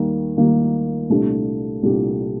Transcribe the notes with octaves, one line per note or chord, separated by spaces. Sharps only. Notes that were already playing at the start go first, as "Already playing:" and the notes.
Already playing: D#2 D#3 G3 A#3
D#2 D#3 G3 A#3
C2 A#2 A3 D4 G4
C2 A#2 A3 D4 G4